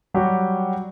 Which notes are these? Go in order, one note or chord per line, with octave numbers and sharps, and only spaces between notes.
F#3 G3 F#4 G4